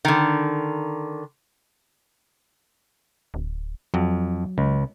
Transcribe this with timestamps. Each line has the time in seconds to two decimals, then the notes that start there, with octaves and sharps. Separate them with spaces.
0.05 D3 D#3
3.34 D1
3.94 F2 F#3
4.58 C#2